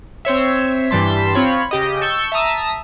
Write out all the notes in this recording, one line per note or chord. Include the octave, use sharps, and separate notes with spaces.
C4 C5 C#5 E5
G2 E3 G3 A5 C6 B6
C4 F4 C#5 B5
C#3 G4 D#5
A5 C#6 E6 G6
E5 A5 A#5 D#6 E6